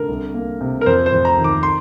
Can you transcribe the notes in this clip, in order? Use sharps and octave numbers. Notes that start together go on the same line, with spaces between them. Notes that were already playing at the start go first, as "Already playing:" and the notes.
Already playing: D3 A#4
C2
A#3
C3
A#4
F2 C5
C5
F2
A#5
D#3
D6
C6